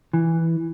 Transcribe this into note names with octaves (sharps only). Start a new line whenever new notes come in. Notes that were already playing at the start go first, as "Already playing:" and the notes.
E3